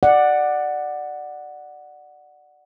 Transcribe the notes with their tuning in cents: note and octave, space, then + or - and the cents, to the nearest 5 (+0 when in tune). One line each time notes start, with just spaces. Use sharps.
D5 +15 F#5 +0